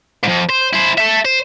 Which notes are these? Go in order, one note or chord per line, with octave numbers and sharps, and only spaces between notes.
F2 G#2
C5
E4 C5
A4 E5
C5